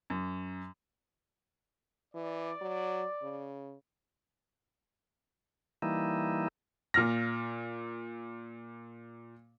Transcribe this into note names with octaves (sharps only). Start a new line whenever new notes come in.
F#2
E3 D5
F#3
C#3
E3 G3 A#3 D#4 E4
A#2 F6 A#6